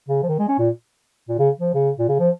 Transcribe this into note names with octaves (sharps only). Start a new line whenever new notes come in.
C#3
F3
D#3
G#3
C#4
A#2
A#2
C#3
F3
C#3
A#2
C#3
F3